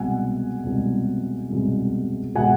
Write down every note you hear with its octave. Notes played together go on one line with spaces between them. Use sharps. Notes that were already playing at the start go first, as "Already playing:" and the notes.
Already playing: C2 B2 G#3 F#5 G#5
C2 B2 G#3
C2 B2 G#3
B2 G#3 F#5 G#5